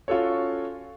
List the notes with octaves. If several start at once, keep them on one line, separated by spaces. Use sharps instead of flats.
C#4 F4 F#4 A4 C#5